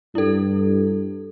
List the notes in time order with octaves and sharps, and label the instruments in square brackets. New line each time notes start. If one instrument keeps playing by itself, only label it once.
[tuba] G2 [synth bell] E4 A4